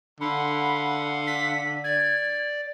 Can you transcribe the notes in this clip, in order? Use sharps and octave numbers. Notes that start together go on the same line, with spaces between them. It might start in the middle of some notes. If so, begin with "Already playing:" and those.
D3 F5 F#5 B5 C6
B6
D5 G#6